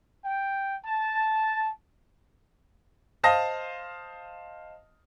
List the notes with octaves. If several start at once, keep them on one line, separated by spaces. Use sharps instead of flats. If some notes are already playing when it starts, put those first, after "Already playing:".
G5
A5
C5 D#5 F5 A5 D#6 A#6